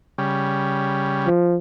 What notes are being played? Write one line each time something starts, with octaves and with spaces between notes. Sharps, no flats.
C#3 G3
F3